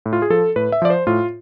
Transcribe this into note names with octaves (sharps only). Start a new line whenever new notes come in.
A2
F4
G#4
F3 A4
A2 B4
E5
F3 D5
C5
A2 F4